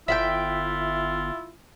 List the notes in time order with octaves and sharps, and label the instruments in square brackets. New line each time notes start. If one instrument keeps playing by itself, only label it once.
[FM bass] G1 [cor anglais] E4 [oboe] F4 [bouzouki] E5 F#5 G5